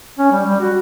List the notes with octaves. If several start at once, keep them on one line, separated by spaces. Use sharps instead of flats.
C#4
G3
G3
F#4